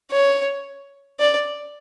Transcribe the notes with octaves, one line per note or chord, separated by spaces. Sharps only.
C#5
D5